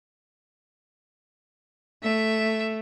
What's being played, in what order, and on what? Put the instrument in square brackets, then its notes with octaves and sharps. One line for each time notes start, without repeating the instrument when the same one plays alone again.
[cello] A3 [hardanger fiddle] E5